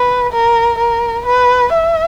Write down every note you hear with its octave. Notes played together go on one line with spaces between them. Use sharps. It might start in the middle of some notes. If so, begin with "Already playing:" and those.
Already playing: B4
A#4
A#4
B4
E5